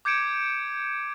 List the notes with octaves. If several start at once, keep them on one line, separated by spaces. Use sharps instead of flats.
D6 G6 G#6 C#7 D7 E7